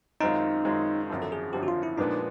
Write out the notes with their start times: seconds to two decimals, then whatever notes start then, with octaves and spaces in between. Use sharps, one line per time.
0.21 F#2 D#3 G#3 C4 D#4 F4
0.65 F#2 D#3 G#3 C4 F4
1.10 G#1 F#2 D3 F3
1.22 A4
1.32 G#4
1.53 G#1 F#2 D3 F3 G4
1.63 F#4
1.68 F4
1.83 E4
1.98 A#2 F3 G#3 B3 D4 D#4